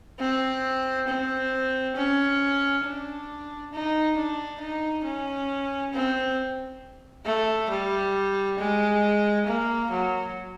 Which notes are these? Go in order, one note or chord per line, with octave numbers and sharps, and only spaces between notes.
C4
C4
C#4
D4
D#4
D4
D#4
C#4
C4
A3
G3
G#3
A#3
F#3